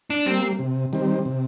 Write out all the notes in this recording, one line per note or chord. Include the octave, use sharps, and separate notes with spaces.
D4
G3 A#3 C4
C3
D#3 G3 C4
C3